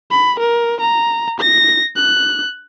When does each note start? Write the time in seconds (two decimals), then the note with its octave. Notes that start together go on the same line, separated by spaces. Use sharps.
0.11 B5
0.40 A#4
0.80 A#5
1.40 A#6
1.96 F#6